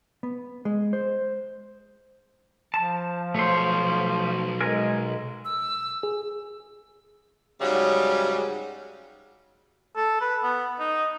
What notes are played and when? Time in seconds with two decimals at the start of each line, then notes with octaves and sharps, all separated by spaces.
0.23 B3
0.65 G#3
0.93 C5
2.74 F3 A5
3.34 B1 A3 C5 C#5
4.60 G#3 A#4 G#5
5.45 E6
6.03 G#4
7.61 G#2 C#3 F#3 G3
9.96 A4
10.21 B4
10.43 B3
10.79 D#4